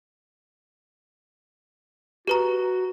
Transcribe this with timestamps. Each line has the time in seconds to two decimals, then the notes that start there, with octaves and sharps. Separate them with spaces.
2.27 F#4 G4 B4 A#5